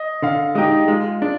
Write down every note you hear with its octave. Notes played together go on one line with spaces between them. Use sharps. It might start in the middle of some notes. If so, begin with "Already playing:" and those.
Already playing: D#5
D3 F5
G#3 D#4 G4 D#5
G#3 F4
D4